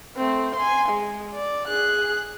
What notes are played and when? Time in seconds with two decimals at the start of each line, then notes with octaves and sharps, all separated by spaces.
0.17 A3 C4
0.56 G#5 C6
0.89 G#3
1.34 D5
1.68 G#4 F#6